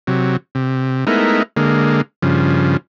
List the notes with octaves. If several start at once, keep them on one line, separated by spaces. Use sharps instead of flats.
C3 F#3
C3
G#3 A3 B3 D#4 E4 A#4
D3 G#3 A#3
G2 C#3 F3